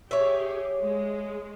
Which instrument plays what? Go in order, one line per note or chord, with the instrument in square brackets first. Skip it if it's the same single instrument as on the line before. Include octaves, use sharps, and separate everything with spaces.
[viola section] G4 G#4 [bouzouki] C#5 E5
[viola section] G#3